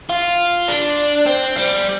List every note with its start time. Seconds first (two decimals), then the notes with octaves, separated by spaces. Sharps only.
0.10 F4
0.68 D4
1.26 C4
1.56 G3